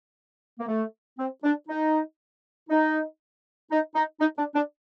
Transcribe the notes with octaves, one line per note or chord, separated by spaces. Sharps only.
A#3
A3
C4
D4
D#4
D#4
D#4
D#4
D#4
D4
D4